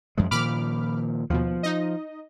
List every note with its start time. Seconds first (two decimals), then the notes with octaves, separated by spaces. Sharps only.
0.18 F#2 F3 G#3
0.31 A#2 D#3 F3 B5 D6 F6
1.30 D#2 B2 F3
1.63 D#4 D#5